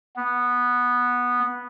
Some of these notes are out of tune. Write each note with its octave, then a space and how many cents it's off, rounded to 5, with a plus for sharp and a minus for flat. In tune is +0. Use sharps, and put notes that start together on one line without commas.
B3 -10